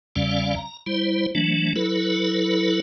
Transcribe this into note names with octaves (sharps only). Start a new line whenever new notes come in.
E2 C#3 G3 C#4 D5 F5
A#5
G3 E4 C5
E3 F#3 A3 D4
F#3 E4 A4 B4